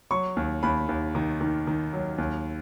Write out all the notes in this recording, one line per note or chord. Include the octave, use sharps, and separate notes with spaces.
F#3 C#6
D#2
D#2 B5
D#2
D#3
D#3
D#3
F#3
D#2